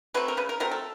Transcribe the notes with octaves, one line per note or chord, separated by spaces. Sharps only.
F#3 A3 C4 B4
A#4
C#3 B4
A#4
F#3 A3 C4 A#4
A4